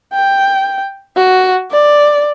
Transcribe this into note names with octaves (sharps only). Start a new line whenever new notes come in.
G5
F#4
D5